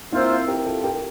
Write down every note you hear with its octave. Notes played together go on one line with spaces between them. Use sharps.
A#3 C4 E4 F4 C5 E5
G4 A#4
F4 A4
G4 A#4